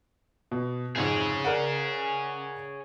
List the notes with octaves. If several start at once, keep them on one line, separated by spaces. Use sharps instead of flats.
B2
F2 G#2 C3 G#4 C#5
A#4 D5 F#5